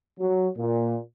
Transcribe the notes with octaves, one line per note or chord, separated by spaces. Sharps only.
F#3
A#2